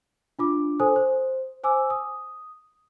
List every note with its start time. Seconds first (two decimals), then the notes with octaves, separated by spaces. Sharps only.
0.39 D4 F4 D6
0.80 A4 C5 G#5 D#6
0.96 C5
1.64 C5 G#5 D6 E6
1.90 D#6